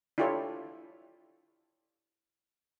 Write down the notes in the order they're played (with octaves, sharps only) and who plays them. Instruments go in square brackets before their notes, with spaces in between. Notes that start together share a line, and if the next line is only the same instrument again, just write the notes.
[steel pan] D4 E4 F4 G4 A4 C#5